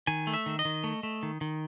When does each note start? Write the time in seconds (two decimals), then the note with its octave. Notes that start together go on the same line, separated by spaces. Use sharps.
0.07 D#3 G#5
0.27 A3
0.33 E5
0.46 D#3
0.59 D#5
0.65 D#3
0.84 A3
1.03 A3
1.23 D#3
1.41 D#3